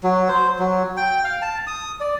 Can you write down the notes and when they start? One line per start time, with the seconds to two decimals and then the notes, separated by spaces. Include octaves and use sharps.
0.04 F#3
0.28 C5
0.59 F#3
0.97 G5
1.24 F5
1.42 A5
1.67 D#6
2.00 D5